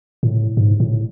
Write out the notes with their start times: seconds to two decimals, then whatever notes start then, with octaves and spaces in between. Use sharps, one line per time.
0.23 A2
0.57 G#2
0.80 A2